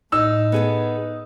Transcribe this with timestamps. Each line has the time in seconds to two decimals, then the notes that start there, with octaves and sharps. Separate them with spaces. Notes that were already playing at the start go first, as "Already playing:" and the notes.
0.12 A2 D#4 E6
0.52 B3 G#4 A4